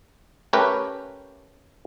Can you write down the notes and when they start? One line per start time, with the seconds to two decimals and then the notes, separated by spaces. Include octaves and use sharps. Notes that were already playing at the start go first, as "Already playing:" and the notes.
0.53 A3 C#4 G4 A#4 B4 G5